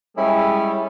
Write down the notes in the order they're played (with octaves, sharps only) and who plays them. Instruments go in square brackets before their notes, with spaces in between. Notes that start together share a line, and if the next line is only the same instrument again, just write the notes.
[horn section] G3 G#3 C#4 E4 G#4 A4